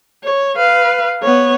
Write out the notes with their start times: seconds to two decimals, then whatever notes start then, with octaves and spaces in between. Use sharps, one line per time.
0.24 C#5
0.56 B4 F5
1.23 B3 C#5